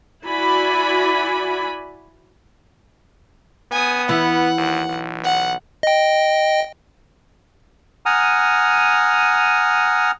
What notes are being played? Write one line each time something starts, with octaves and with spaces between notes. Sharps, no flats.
E4 F#4 D5 G#5 B5
B3 G#5 D#6
E3 E4 F#5
D#2
B1
F#5
D#5 G5
F#5 G#5 A#5 D#6 F6